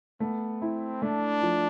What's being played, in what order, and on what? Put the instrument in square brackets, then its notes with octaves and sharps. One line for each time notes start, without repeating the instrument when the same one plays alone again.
[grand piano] A3 [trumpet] B3
[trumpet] C4 [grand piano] E4
[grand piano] A3 [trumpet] D4
[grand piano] F3